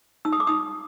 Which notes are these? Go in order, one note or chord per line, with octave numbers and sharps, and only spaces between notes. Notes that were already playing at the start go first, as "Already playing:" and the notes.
D#4 E6
D#6
D6
D#4 D#6